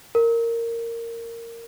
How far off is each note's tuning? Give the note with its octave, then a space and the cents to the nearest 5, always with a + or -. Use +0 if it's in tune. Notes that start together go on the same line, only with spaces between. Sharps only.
A#4 -15